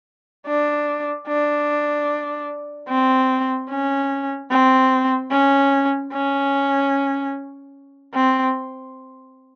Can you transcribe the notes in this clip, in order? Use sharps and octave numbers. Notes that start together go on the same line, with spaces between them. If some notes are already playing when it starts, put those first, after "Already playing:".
D4
D4
C4
C#4
C4
C#4
C#4
C4